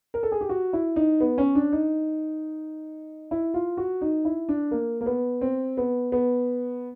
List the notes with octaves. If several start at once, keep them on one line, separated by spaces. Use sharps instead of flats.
A#4
A4
G#4
G4
F#4
E4
D#4
B3
C#4
D4
D#4
E4
F4
F#4
D#4
E4
D4
A#3
A#3
B3
C4
B3
B3